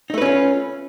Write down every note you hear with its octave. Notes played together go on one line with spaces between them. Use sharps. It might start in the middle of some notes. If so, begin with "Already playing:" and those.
A3 C#4 D#4 F4 B4